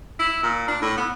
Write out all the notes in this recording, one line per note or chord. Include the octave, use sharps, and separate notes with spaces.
E4
A#2
D4
A2
B3